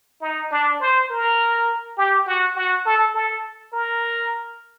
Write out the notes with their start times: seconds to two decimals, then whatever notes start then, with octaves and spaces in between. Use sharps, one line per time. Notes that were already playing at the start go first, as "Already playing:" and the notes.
0.21 D#4
0.51 D4
0.80 C5
1.10 A#4
1.98 G4
2.26 F#4
2.56 F#4
2.86 A4
3.15 A4
3.73 A#4